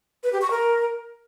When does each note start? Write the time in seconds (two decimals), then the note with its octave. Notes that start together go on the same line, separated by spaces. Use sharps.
0.23 B4
0.32 G4
0.41 C#6
0.51 A#4